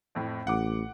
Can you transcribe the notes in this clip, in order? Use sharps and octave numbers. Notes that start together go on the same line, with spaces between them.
F2 A2
A1 F#5 D6